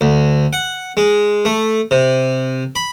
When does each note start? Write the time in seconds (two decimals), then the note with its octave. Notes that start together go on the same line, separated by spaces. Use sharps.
0.01 D2
0.53 F#5
0.97 G#3
1.45 A3
1.91 C3
2.76 B5